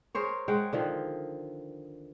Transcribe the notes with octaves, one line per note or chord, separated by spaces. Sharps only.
G#4 A#4 C5 C#5
G#3 F#5 G5
D3 D#3 F3